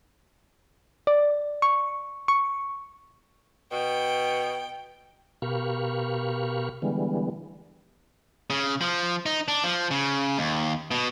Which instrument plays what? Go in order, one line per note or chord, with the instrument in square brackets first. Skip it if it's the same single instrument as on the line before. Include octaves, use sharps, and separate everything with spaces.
[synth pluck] D5
C#6
C#6
[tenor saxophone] B2 [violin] G5
[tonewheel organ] B2 G4 A#4 F5 B5 C#6
D3 E3 G3 G#3 B3
[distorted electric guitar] C#3
F3
D#4
D4
F3
C#3
D#2
B2